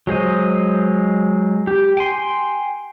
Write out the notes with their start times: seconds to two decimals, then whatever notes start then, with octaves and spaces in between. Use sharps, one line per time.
0.07 F#3 G#3 C5 D#5
1.67 G4
1.97 G5 G#5 C6